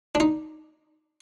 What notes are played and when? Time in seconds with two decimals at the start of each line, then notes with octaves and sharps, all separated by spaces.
0.15 D4
0.20 D#4